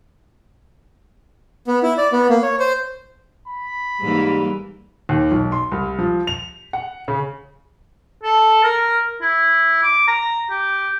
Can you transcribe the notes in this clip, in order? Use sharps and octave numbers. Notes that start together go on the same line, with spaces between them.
B3
E4
D5
B3
A#3
C#5
C5
B5
G#2 E3 G3 A#3
D#2
B1
C6
C2
F3
F7
F#5
C#3
A4
A#4
E4
D6
A#5
G4